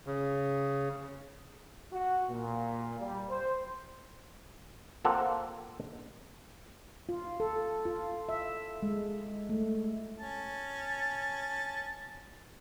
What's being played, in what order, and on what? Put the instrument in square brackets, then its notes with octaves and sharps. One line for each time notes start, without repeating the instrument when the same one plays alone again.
[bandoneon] C#3
[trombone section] F#4
A#2
G3
C5
[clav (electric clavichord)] A#3 C4 F4 A4 F#5 A#5
[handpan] F4
A4
F4
E5
G#3
A3
[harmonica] C#4 A5